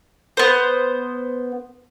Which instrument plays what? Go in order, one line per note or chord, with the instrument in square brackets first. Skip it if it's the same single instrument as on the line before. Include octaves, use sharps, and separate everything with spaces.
[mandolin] B3 C5